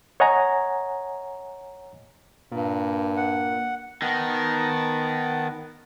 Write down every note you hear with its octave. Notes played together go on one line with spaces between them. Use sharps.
C#5 D#5 F#5 G#5 A#5
G2 A#2
F#5
D#3 B3 F#5 A5